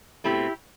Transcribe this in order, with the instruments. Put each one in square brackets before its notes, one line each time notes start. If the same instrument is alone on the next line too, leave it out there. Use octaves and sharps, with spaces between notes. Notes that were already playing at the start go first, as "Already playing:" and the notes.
[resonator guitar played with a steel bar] B2 A3 C4 E4 G4